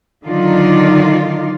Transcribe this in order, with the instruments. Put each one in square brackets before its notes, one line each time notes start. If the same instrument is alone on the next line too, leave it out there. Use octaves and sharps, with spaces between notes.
[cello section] D3 D#3 F#3 D#4 F4 D5